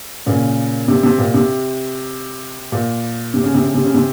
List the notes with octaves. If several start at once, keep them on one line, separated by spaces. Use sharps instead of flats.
A#2 C#3
C3
C3
A#2
C3
A#2
C3
C#3
C3
C#3
C3
C#3
C3